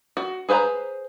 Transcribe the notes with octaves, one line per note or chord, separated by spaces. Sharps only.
F#4
G#4 B4 C5 G#5 A#5